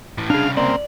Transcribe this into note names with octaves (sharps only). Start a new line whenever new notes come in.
A2 E3
C2 C#3 D4 G#4 F5
A#3 C4 D5